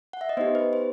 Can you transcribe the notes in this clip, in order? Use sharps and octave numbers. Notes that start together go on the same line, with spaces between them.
F#5
E5
D#5
B3 D#4 G4 C5
B4
C5